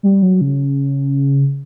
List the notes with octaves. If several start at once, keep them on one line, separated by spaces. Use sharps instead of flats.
G3
F#3
C#3